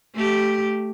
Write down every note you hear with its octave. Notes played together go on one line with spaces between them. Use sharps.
A3 G4